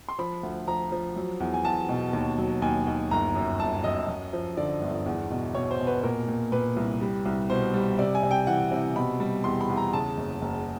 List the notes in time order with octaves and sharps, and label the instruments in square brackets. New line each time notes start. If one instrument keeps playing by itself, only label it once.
[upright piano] C6
F3 B5
D2
F3 A#5
F3
F#3
E2
G#5
E2 A5
B2
D#2
F#3
D#2 G#5
D#2
G1 A#5
F#2
G1 A5
F#2 D#5
F#2
F3
D3 D5
G1
E2
B2
B2 C#5
C5
B2
B4
A#2 A#4
A#2
A#2 B4
C2
G3
C2
B2 C5
G3
C3 D5
G#5
C3
G5
E3 F#5
C3
B2 B5
G3
E2 C6
B5
E2
A#5
C#3 A5
F#1
F#1